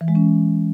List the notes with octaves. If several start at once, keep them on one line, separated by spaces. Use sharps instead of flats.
E3
G#3
C#4